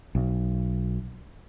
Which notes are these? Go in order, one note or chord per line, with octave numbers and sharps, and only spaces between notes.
B1